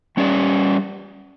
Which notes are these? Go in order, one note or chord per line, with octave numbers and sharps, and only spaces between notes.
G3 C#4 G4 D5